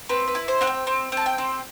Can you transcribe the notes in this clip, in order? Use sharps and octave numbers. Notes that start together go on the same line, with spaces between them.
C4 B4
B4
E4
C5
C4 F#5
G5
C4
C4 A5
G5
C4